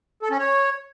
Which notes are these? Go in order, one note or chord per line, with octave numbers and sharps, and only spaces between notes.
A4
C#4
C#5